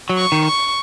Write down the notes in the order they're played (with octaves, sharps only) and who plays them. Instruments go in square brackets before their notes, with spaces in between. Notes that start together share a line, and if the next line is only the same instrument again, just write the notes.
[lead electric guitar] F#3
[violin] C#6
[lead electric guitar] D#3
[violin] C#6